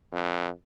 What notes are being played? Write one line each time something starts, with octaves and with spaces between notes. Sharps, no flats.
F2